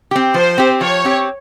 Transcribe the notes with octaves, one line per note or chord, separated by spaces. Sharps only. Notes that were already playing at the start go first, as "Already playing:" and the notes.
C4 G4
F3 C5
C4 G4
F3 C#5
C4 G4